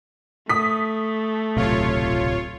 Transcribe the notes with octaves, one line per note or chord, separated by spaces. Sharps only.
A3 D#6 B6
D1 B1 C3 F4 C#5